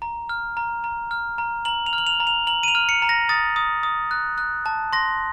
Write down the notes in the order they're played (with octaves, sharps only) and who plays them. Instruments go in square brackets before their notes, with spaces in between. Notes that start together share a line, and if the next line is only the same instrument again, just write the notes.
[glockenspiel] A#5
F6
A#5
A#5
F6
A#5
A#5 F#7
F7
F6
F#7
F7
A#5
F7
A#5 F#7
D#7
F7
F6
C#7
A#5
A#6
D#6 A6
D#6
D#6
F#6
F#6
A5
C6 A#6